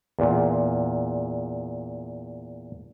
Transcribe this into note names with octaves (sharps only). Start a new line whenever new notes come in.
E2 A#2